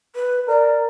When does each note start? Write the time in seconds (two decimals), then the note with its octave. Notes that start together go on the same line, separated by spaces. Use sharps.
0.16 B4
0.48 A#4 D5